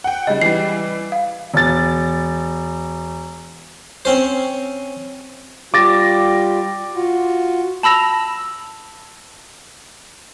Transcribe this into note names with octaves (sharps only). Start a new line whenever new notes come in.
F#5 G5
C#3 G3 D#5
E3 G3 C7
F5
E1 A6
C4 C#4 C5
G3 F4 G4 D6 A6 A#6
F4 F#4
A5 B5 E6 A#6 F7